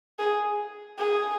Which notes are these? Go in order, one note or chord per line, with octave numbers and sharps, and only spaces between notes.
G#4
G#4